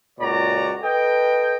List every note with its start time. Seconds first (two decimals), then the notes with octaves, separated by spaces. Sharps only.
0.20 C#2 A#2 F#4 C#5 D5 A#5
0.83 A4 B4 D#5 G5